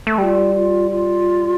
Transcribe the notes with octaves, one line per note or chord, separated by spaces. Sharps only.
A3
G3 F4 G4
F4
F4